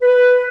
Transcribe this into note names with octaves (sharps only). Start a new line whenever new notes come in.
B4